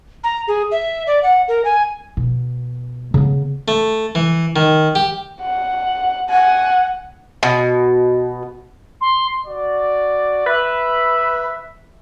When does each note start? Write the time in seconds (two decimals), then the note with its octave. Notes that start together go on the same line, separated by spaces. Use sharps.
0.24 A#5
0.48 G#4
0.71 E5
1.07 D5
1.23 F#5
1.48 A#4
1.65 G#5
2.17 B2
3.14 C#3 B3
3.68 A3
4.15 E3
4.56 D#3
4.95 G4
5.42 F#5
6.30 F#5 G#5
7.43 B2
9.01 C6
9.45 F#4 D5
10.46 B4 E5